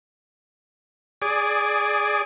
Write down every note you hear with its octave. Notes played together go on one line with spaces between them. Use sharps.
G#4 D5